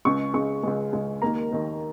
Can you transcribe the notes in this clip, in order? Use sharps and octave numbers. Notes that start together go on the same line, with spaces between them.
C#2 C#3 G#3 C#6
C#2 C#3 G#3 C#6
C#2 C#3 G#3
C#2 C#3 G#3
D#2 D#3 A#3 A#5
D#2 D#3 A#3